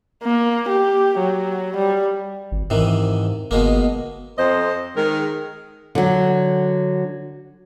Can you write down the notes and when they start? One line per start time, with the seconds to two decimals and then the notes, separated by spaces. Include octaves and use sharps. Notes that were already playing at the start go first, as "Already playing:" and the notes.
0.23 A#3
0.69 G4
1.18 F#3
1.76 G3
2.52 G#1
2.70 G#2 C3 D#3 E3
3.51 G1 B2 G#3 A#3
4.38 F2 C5 D#5
4.97 D#3 G#3 A#4
5.95 D3 F#3